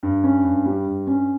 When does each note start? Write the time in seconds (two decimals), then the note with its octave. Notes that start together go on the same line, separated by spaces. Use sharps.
0.03 G2
0.24 C#4
0.44 G2
0.66 G3
0.86 G2
1.07 C#4